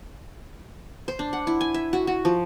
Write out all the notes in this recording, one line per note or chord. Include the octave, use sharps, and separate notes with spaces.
C5
D4
F#5
E4
G#5
E5
F#4
F#4
F3